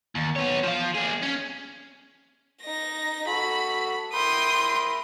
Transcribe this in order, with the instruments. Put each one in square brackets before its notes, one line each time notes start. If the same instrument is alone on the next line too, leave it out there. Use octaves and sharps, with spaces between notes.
[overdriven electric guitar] D#2
B3 C#5
F3 F4
A#3 G#4
C#4
[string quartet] D#4 A#6
[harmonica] F#4 A4 [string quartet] B5
[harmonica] A#4 E5 B5 [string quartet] G5 C6 D#6